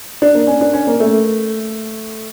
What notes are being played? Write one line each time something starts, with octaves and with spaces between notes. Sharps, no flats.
D4
A#3
C#4
D4
C#4
A#3
A3